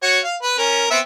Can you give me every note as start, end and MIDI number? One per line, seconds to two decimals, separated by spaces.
0.02 0.19 66
0.02 0.19 73
0.24 0.36 77
0.42 0.56 71
0.58 0.86 61
0.58 0.86 70
0.91 0.99 59
0.91 0.99 60
0.91 0.99 76